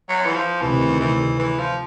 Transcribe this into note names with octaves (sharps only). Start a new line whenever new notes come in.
F#3
E3
F3
D2 C3 D#3 E3
E3
E3
F3